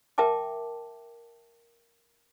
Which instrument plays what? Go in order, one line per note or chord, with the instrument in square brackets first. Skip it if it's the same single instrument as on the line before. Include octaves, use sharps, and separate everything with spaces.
[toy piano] A#4 E5 G5 A5 D6